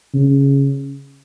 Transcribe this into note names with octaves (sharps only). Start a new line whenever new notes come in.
C#3